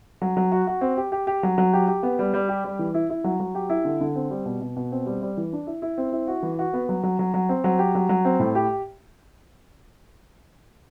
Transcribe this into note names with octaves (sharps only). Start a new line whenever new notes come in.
F#3
F#3
F#4
F#4
C4
G4
G4
G4
F#3
F#3
G4
G4
B3
G3
G3
G4
G3
E3
E4
E4
F#3
F#3
G4
E4
D3
D3
C4
G3
B2
B2
B2
C4
G3
G3
E3
D4
E4
E4
C4
E4
F#4
E3
F#4
B3
F#3
F#3
F#3
F#3
C4
F#3
G4
F#3
F#3
C4
A2
G4